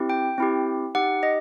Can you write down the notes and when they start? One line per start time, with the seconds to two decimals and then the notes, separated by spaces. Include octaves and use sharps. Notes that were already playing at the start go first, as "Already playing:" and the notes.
Already playing: C4 E4 G4
0.10 G5
0.38 C4 E4 G4
0.95 D#4 G4 F#5
1.23 D#5